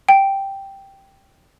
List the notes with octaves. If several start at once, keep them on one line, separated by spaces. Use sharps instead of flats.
G5